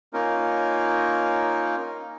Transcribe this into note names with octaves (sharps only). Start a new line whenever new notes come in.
A#3 C#4 D#4 F4 A#4